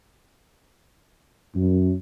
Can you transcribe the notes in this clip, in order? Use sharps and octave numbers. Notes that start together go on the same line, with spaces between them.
F#2